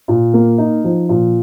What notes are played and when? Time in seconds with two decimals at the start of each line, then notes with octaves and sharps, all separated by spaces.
0.08 A#2
0.34 A#3
0.58 D#4
0.84 F3
1.09 A#2